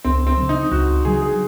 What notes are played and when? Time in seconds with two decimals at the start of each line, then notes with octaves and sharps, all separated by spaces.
0.04 C#2 C4
0.27 C4
0.37 C#3 F#3
0.49 D#4
0.72 C#2 F#4
1.05 C#3 F#3 G#4
1.22 G#4